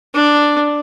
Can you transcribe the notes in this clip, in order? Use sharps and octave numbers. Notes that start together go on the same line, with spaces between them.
D4